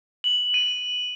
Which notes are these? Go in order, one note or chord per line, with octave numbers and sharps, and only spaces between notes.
F#7
D#7